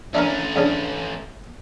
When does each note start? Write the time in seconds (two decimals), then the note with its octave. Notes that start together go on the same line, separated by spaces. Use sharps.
0.15 A3 C#4 D4 E4 A#4
0.56 G2 C#3 D4